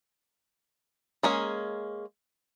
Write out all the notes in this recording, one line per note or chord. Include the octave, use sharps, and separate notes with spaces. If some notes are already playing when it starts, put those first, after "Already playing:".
G#3 A#3 C#4 G#4